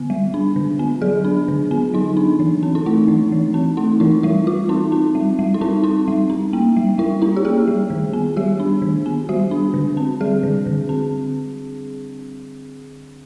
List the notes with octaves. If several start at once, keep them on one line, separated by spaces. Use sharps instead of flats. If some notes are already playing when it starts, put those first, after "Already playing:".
Already playing: D3 B3
G3
D4
D3
B3
F#3 G#4
D4
D3
B3
F#3 D#4
D4
E3
C4
D#4
A3 E4
E3
E3
C4
A3 D#4
E3 E4
G3 E4
G3 F4
C4 D#4
C4
G3
G3
D#4
C4 E4
C4 D#4
G3
C#4
A#3
G3
G3 E4
C#4 E4
G4
A#3 G#4
G3
D#3
B3
G3 G4
D4
D#3
B3
G3 F#4
D4
D3
C4
G3 G#4
D3
D3
C4